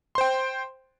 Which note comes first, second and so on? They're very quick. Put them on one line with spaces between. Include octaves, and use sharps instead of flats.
C6 C5 G5